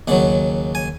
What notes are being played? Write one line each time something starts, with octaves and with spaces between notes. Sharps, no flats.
D#2 C#3 F#3 F#5
G#5